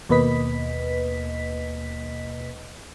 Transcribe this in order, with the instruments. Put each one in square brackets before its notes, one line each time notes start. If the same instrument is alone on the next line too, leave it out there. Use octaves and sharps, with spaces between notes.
[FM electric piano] D#2 B2 A#3 B4 D#5 B6